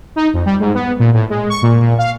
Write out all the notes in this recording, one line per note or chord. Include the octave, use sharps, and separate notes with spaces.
D#4
F2
G3
G#2
B3
A#2
A2
G#3
C#6
A#2
A#2
F5